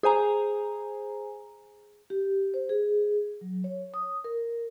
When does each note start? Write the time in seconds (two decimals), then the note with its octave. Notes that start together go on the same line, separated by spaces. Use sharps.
0.03 G#4 C5 G#5 A#5
2.10 G4
2.54 C5
2.69 G#4
3.41 F#3
3.64 C#5
3.94 D#6
4.24 A#4